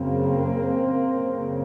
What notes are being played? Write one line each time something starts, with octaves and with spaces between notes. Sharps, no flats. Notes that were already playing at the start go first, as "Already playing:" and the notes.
Already playing: F#2 C#3 A#3 C4
F#2 C#3